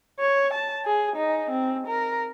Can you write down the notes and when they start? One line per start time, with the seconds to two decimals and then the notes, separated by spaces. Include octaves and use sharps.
0.20 C#5
0.54 A5
0.85 G#4
1.16 D#4
1.50 C4
1.87 A#4